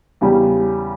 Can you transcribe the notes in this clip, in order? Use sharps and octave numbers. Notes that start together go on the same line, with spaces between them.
E2 C#3 G3 C#4 G4